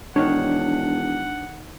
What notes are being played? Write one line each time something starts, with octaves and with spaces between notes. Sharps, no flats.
E1 D#3 D4 C#5 F#5